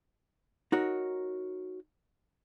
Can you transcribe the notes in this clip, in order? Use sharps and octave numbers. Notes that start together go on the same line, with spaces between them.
D#4 F#4 A#4 C#5